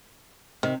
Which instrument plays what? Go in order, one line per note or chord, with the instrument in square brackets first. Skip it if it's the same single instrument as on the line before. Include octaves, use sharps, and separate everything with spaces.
[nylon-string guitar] C3 [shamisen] D#3